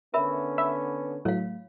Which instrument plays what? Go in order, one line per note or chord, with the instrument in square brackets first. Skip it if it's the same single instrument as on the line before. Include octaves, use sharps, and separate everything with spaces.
[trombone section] D3 B3 C#4 [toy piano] A#4 E5 B5
[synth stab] E5 [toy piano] B5
[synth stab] A2 F#3 [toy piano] C#5 F5